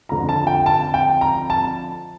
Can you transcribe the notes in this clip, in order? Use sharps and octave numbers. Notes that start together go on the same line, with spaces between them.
F2 D3 F3 A#5
A5
G5
A5
G5
A#5
A5